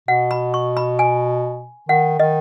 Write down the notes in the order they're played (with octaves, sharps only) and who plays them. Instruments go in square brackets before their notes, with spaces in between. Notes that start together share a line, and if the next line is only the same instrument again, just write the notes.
[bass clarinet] B2 [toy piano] F#5
[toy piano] B5
C#6
B5
G#5
[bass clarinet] D#3 [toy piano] F#5
[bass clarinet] D#3 [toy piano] D#5